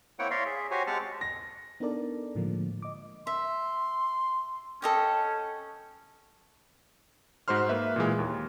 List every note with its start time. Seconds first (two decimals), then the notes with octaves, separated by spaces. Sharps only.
0.19 A#3 C4 E4 C#5 F#5 G5
0.31 C#5 D5 E5 F5 A#5 C6
0.46 G#4 E5
0.71 F#4 G4 C5 C#5 G#5 A#5
0.87 G#3 C4 G4 F#5 A5 F6
1.21 A#6
1.80 B3 D4 D#4 A4 A#4 D5
2.35 A2 D3 F3 G#3 A#3
2.82 D#5 D6
3.27 E5 C6
4.82 C#4 A4 D#5 G5
7.48 G#2 F#4 C5 C6 F6
7.69 A#3 B4 E5
7.96 A#2 E3 G#3
8.19 D#2